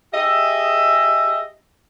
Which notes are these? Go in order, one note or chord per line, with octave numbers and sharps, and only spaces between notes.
G4 G#4 D#5 E5